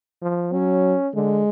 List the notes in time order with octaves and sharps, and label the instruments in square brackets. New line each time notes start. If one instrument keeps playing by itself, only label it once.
[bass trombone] F3
[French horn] F#3 [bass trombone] C#4
[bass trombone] D3 [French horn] G#3